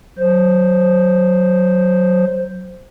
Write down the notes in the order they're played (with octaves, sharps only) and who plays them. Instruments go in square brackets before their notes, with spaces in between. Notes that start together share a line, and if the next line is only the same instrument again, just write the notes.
[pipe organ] F#3 C5